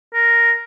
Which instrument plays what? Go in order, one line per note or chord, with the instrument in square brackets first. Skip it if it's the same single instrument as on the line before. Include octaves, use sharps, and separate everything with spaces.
[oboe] A#4